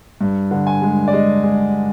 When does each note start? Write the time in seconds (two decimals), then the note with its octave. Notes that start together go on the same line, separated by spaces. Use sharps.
0.21 G2
0.51 D3
0.67 G#5
0.82 G#3
1.08 D5
1.13 G#3 D#5
1.44 G#3